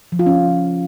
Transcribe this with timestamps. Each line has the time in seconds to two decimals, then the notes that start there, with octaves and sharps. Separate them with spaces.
0.12 F3
0.19 F4
0.26 C#4